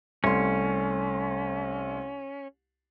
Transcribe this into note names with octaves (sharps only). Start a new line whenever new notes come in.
C2 A3 C#4 C6